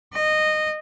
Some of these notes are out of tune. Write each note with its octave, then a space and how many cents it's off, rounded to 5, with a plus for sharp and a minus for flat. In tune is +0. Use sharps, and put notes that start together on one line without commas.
D#5 -15